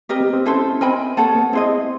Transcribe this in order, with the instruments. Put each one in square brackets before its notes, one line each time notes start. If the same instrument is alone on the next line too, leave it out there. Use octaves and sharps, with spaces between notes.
[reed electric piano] C4 [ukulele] G4 A#4 D#5
[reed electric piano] B3
C4
[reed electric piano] C#4 [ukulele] E4 A4 C5
[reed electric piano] C4 [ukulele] A#4 D#5 G#5 B5
[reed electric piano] A#3 [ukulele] A4 C#5 F#5 A5
[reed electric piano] B3
[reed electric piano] C4 [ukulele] E4 G#4 C5 D#5